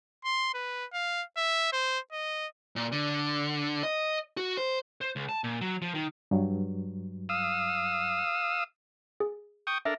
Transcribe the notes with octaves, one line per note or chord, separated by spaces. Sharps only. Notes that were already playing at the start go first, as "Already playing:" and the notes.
C6
B4
F5
E5
C5
D#5
A#2
D3
D#5
F#4
C5
C5
C#2
A5
A#2
F#3
F3
D#3
G2 F#3
F5 D#6 E6
G#4
G5 C#6 D#6
D4 A4 A#4 E5